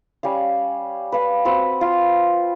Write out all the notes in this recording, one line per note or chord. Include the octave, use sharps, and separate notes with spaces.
G3 C#4 F5
B4 F5
C4 F#4 B4
F4